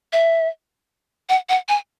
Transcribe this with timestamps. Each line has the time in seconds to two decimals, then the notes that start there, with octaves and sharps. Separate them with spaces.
0.13 E5
1.29 F#5
1.49 F#5
1.69 G#5